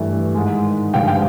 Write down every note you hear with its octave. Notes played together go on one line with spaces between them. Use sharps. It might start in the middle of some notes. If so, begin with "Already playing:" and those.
Already playing: G2 E3 A3
G#2 D#3 G#3
G2 D3 F3 G#3 F5 G5
F5 G5